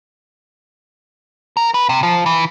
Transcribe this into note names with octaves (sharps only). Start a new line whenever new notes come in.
A#4
B4
C3
F3
E3